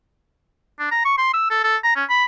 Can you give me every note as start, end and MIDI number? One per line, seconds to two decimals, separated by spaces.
0.80 0.88 62
0.92 1.01 82
1.05 1.14 85
1.18 1.33 84
1.34 1.46 88
1.51 1.63 69
1.64 1.77 69
1.84 1.96 82
1.96 2.04 61
2.10 2.25 83